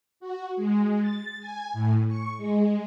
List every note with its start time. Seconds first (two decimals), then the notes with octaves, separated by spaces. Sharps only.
0.20 F#4
0.56 G#3
1.01 A6
1.40 G#5
1.73 A2
2.07 C#6
2.38 G#3